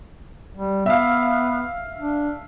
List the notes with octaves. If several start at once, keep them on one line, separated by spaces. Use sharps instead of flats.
G3
B3 E5 F5
D4